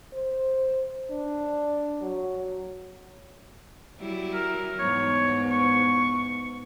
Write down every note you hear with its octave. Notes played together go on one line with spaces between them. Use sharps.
C5
D4
F#3
F#3 G3 E4
A#4
E2 G#2 C#5
C#6